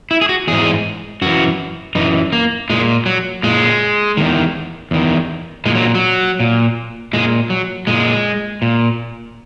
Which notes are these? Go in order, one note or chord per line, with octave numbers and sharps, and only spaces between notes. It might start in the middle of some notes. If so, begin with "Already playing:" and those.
E4
G#4
F#4
G#2 E3 G#4
F#2 E3 F#4
F#2 E3 D#4
A#3
A#2 G#3
F#3
A#2 G#3
E2 D#3
E2 D#3
A#2 G#3
F#3
F#3
A#2
A#2 G#3
F#3
A#2 G#3
A#2